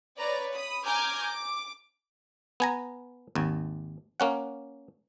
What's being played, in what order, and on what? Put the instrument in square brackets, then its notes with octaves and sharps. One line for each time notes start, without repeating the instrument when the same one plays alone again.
[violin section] B4 C#5 D5 A#5
B5 D#6
G#5 A#5 D6 F6 G6 G#6
D6
[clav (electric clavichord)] B3 G#5 A#5
G#1 D#2
A#3 C#4 F#5